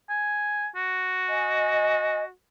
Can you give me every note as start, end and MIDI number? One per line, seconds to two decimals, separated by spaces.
0.10 0.67 80
0.76 2.31 66
1.29 2.23 75
1.29 2.23 80